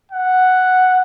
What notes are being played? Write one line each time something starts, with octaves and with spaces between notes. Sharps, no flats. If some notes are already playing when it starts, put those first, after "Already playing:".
F#5